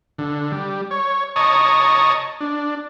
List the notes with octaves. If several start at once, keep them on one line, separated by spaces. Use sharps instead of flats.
D3
G3
C#5
C#5 D#5 A5 A#5 C#6 D#6
D4